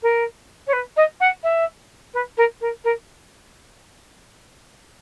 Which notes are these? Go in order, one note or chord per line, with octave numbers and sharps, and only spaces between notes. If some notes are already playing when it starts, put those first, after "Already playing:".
A#4
C#5
B4
D#5
F#5
E5
B4
A#4
A#4
A#4